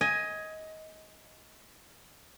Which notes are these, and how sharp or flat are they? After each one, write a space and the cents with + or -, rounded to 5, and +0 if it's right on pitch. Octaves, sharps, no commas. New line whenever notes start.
D#5 +20 G#5 +0